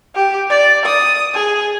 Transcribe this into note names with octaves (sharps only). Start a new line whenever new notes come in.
G4
D5
D#6
G#4